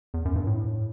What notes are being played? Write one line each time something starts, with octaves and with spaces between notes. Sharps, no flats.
E2
F#2
G2
A2